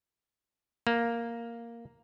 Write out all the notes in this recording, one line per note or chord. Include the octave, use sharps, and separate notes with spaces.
A#3